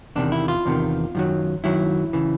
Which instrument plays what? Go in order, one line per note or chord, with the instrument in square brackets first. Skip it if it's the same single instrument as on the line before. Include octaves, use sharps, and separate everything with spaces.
[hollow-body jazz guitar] E2 C3 D#3 D4
E4
F4
E2 C3 D#3
F#2 D#3 F#3
F#2 D#3 F#3 E4
C#3 E3